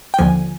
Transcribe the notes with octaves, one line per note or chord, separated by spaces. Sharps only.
G5
D#2 D3 F3 G#5